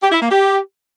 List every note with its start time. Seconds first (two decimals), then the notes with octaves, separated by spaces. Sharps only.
0.02 G4
0.12 E4
0.21 A#3
0.31 G4